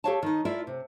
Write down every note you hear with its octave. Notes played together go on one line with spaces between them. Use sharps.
G4 A4 B4 C#5 F5 A5
D#3 D#4
E4 F4 A#4 D5
C3